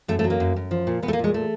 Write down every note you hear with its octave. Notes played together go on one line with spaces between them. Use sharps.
F#2 A3
A3
F#3
A#3
F#2
F#2
F3
A#2
A#2 B3
A3
A#3
A#2 G#3
A3